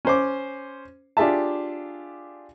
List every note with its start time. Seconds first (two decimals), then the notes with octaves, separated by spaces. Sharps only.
0.05 C#4 C5 D6
1.17 D4 F4 G4 G#4 E5 A5